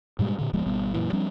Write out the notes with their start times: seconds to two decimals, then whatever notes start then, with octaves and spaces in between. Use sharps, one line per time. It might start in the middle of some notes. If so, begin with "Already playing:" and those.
0.19 G#2 B2 G3 G#3
0.38 A#2 D3
0.53 D1 F3 G#3 B3
0.66 G#1 B2 G3 B3
0.94 F#2 A#2 E3
1.13 F3 G3 C4 D4